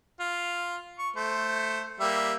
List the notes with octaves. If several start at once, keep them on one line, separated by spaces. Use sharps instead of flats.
F4
C#6
A3 C5
G3 A#3 E5